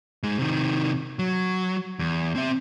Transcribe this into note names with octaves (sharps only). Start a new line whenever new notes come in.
G#2 G#3
C3 D#3
F#3
E2
C4 E5